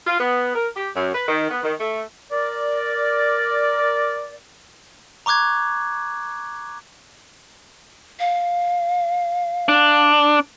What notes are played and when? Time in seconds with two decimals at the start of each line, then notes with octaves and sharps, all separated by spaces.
0.06 F4
0.20 B3
0.55 A#4
0.77 G4
0.96 F#2
1.14 B4
1.28 D#3
1.51 B3
1.63 D#3
1.79 A3
2.32 A#4 D5
5.26 A#5 C#6 D6 F#6 G#6
8.20 F5
9.69 D4